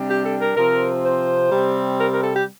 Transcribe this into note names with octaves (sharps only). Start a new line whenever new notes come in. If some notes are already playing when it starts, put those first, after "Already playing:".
Already playing: C3 G3 D4
G4
A4
A#4
C3 F3 C4 A#4
C5
C3 G3 C4
A#4
A#4
A4
G4